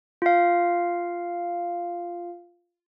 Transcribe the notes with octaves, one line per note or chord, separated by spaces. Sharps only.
F4 F5